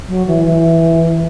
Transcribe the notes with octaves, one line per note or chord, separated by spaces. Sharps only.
F#3
E3
E3